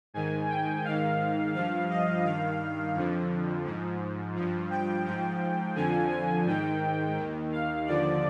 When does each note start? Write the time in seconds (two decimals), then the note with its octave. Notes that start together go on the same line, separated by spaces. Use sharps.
0.14 G#2 D#3 G#5
0.49 G5
0.84 G#2 D#3 F5
1.54 G2 F3 F5
1.90 D#5
2.25 G2 D#3 F5
2.95 F2 D3 F3
3.65 G#2 F3
4.36 G2 F3
4.70 G5
5.05 G#2 F3 G5
5.75 F2 D3 F3 G#5
6.11 G#5
6.46 G#2 D#3 G5
7.17 D#2 D#3
7.52 F5
7.86 D#2 D3 F3 D5